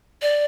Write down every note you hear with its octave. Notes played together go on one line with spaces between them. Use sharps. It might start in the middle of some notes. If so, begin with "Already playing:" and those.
D5